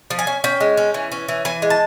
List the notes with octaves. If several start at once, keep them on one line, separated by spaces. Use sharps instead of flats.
F3
G#5
C#4
C#4 G5
G#3
C#4
E3
C#4
E3
E3 G#5
G#3
A5